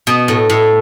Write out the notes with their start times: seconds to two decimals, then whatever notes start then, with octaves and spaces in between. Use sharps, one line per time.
0.07 B2
0.28 A2
0.50 A2